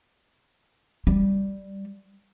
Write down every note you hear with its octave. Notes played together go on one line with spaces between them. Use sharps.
G3